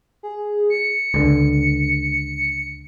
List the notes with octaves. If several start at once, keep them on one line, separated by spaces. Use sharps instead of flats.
G#4
C#7
C#2 D3